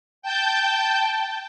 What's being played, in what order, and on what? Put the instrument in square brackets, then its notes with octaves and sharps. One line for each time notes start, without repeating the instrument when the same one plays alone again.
[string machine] G5 A5 G6